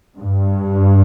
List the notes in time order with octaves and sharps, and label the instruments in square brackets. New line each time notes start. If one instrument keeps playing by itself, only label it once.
[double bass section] G2